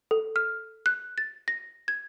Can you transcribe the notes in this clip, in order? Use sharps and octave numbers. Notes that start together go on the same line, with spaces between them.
A4
F6
F#6
A6
A#6
G#6